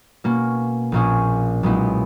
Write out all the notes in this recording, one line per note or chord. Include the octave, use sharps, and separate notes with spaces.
B2 A#3 C#4
A#1 A#2 A#3 C#4 G#4
B1 A#2 G#3 B3 E4